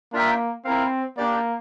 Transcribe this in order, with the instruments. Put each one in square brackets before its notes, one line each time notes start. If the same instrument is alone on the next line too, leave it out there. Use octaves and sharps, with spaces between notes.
[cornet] A#3 [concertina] D4 F4 A#4 E5 G5
[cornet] C4 [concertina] E4 A#4 F5
[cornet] A#3 [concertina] D4 G4 D5